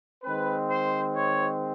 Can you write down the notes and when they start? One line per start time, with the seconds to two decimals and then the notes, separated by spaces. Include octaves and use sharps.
0.23 D#3 G#3 C4 B4
0.69 C5
1.16 C#5